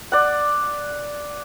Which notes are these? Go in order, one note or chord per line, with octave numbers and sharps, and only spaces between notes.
D5 F#5